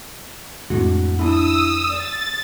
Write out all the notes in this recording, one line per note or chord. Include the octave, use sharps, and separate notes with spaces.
F2 A2 G#3 D4 F#4
D4 E4 D#6 E6
D5 A6